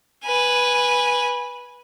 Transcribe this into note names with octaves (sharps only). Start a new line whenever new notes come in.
B4 G#5